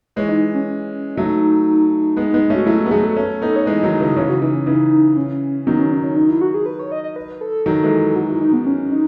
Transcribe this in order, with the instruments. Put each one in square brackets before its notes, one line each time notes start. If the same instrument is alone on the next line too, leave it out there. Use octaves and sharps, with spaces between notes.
[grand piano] E3 G#3 [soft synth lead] C#5
[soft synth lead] D#4
C#4
[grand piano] F#3 A3 [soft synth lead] D#4
[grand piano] G#3 B3
G#3 B3
A3 C#4
[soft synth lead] F#4
[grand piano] F#3 A3 [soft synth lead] E4
[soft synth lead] F#4
[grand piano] B3
[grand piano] F#3 A3 [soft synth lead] G#4
[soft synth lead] A4
[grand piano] A3 C#4
B3 D#4
[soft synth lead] C#5
[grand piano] E3 G#3 [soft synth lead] D#5
[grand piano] D#3 F#3
C#3 E3
[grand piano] C#3 E3 [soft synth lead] C#5
[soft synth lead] F#4
[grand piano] C#3 E3 [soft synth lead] D#4
[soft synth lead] C#4
[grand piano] C#3 E3 [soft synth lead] D#4
[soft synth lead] C#4
[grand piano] D#3 F#3 [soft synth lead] B3
[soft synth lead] C#4
D#4
C#4
D#4
E4
F#4
G#4
B4
C#5
D#5
D#5
B4
A4
[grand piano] D#3 F#3
E3 G#3
[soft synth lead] F#4
E4
D#4
B3
C#4
D#4